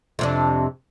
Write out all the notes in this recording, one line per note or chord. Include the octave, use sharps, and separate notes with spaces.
F2 C3 D4